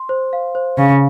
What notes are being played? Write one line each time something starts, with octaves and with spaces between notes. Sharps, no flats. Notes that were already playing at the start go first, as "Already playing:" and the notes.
Already playing: C6
C5
F5
C5
C#3 F5